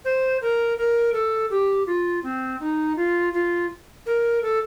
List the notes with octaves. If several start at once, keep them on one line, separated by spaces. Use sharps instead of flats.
C5
A#4
A#4
A4
G4
F4
C4
D#4
F4
F4
A#4
A4